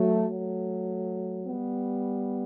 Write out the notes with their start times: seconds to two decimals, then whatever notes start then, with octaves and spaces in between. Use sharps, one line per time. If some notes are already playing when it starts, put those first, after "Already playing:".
Already playing: F#3 A3
0.30 F#3 A3
1.46 G3 B3